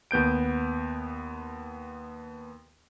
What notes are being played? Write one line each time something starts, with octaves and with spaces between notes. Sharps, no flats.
D#2 B3 G6 D7